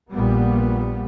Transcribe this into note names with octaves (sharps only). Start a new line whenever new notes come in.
A#1 A#2 G3 B3